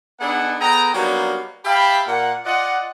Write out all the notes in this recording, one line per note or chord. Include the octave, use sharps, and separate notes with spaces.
B3 D4 D#4 G#4 A4 F#5
B3 G#4 A4 G5 A#5
F#3 G3 A#3 B3 D4 D#4
G4 E5 F5 G5 A5 B5
A#2 A#3 F#5
F4 D5 D#5 F#5